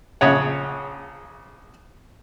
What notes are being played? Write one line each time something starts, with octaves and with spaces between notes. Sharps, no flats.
A#1 C#3 C#5 F#5